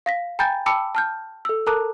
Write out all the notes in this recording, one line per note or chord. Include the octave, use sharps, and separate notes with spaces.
F5 A#6 B6
G5 G#5 A#5 B5 G6 A6
G5 A5 B5 D6 E6 C#7
A5 F6 G6
A4 E6
A4 A#4 A5 A#5 D6 F#6